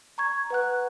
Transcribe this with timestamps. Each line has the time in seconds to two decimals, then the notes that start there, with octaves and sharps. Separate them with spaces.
0.18 A#5 C#6 G#6
0.50 B4 F#5 F#6